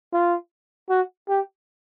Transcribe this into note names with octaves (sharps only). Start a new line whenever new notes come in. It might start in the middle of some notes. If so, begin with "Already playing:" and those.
F4
F#4
G4